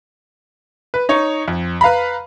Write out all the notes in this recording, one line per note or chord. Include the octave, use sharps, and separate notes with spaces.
B4
D#4 C#5
F2
B4 F5 A#5 B5